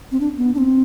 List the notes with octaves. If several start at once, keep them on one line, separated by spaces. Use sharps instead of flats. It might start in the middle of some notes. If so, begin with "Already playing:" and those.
C4
D4
B3
D4
C4